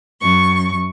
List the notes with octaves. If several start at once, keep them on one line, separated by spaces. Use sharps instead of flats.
F#2 C#6